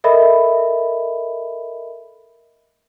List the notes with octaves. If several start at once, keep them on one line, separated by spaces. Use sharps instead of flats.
A4 A#4 D#5 E5 B5